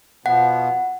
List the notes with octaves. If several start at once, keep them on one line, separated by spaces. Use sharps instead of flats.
B2 F3 B3 F#5